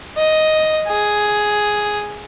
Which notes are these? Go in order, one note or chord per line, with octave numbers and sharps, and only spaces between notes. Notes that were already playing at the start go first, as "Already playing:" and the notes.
D#5
G#4